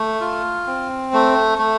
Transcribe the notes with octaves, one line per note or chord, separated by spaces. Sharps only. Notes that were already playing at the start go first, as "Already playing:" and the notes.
Already playing: A3
F4
C4
A3
A3